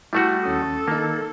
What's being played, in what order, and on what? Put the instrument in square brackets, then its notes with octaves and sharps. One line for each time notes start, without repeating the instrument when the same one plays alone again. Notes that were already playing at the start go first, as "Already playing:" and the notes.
[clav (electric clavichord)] G3 A3 F#4 [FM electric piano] E4
[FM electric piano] D#2 C#4 D#6 [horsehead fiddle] A4
[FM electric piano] D#3 D#4 [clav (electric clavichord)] A#3